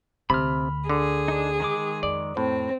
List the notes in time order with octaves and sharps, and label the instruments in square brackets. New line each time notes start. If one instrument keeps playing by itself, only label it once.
[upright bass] D2 [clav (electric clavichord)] C3 [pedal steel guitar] B5 F6
[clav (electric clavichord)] D3 [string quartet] G#4
[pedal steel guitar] D4 D#4
D#3 G#3 D6
[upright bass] F2 [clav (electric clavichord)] D5
[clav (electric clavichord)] A2 [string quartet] C4